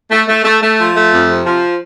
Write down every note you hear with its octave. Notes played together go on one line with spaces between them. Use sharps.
A3
A3
A3
A3
F3
A3
F2
C3
F3